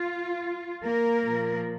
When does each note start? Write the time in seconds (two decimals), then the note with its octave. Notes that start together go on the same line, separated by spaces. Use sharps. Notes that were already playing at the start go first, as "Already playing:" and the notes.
Already playing: F4
0.84 A#3 A#4
1.23 A#2 F3